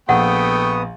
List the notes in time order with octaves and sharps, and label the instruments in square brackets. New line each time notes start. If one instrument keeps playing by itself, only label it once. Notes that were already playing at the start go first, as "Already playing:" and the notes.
[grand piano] A#1 [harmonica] A3 G5 C#6 [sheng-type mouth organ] B3 D#6 [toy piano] F#5